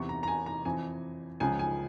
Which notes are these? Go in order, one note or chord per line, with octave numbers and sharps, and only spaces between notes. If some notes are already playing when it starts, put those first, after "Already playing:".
Already playing: E2 C3 E3 C#6
A#5
A#5
G#5
A#5
F2 E3 G#5
C#2 C#3 F3 G#5
G#5